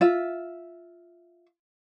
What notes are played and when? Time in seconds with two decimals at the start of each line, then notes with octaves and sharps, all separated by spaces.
0.01 F4 E5